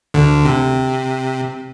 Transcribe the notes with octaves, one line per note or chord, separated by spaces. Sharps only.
D2 D3
C3